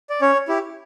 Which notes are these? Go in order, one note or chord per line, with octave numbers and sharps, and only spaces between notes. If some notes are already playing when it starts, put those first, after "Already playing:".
D5
C#4 C#5
E4 G4